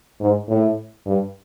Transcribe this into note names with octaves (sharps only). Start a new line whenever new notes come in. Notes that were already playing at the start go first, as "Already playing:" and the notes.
G#2
A2
G2